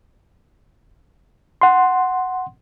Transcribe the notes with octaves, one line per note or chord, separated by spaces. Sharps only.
F#5 C6